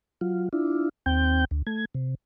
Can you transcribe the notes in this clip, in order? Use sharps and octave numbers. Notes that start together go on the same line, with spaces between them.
F#3 F4
D4 E4 F4
D#2 C4 G5 G6
D2
A3 G#6
C3